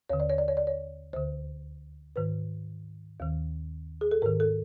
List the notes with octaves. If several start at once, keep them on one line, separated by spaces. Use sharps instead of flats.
D#2 D3 C#5
D5
C#5
D5
C#5
D5
C#5
D2 D3 C5
G#2 D#3 B4
D#2 D#3
G#4
A4
G#2 D#3 A#4
A4